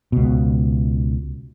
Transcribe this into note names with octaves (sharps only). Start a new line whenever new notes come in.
C#2 B2